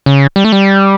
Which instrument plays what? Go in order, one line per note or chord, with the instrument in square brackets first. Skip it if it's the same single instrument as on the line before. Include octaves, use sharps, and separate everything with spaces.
[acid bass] C#3
G3
A3
G3